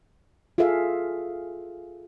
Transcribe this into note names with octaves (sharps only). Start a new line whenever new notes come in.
F4 G#4 A4 E5 F5